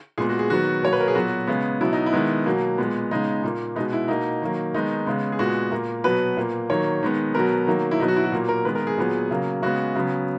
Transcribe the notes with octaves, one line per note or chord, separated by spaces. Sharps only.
A#2 G#3 B3 G#4
F#4
G#4
D#3 F#3 B3 F#4
B2 F#3 A#3 C#5
B4
A#4
G#4
A#2 F#3 B3 F#4
C#3 G#3 B3
B2 F#3 B3 E4
D#4
E4
D#3 G#3 B3
B2 F#3 A#3
A#2 G#3 B3
C#3 G#3 B3 D#4
A#2 A#3
B2 G#3 B3 D#4
E4
B2 A#3 D#4
D#3 F#3 A#3
D#3 G#3 B3 D#4
C#3 G#3 B3
G#4
A#2 G#3 B3 F#4
A#2 A#3
B2 F#3 B3 B4
A#2 A#3
D#3 F#3 A#3 C#5
D#3 G#3 B3
B2 F#3 B3 A#4
D#3 F#3 A#3
E4
B2 F#3 B3 D#4
F#4
E4
F#4
A#2 F#3 A#3
A#4
D#3 G#3 B3 B4
A#4
G#4
A#2 F#3 B3
C#3 F#3 A#3
C#3 G#3 B3 F#4
C#3 F#3 B3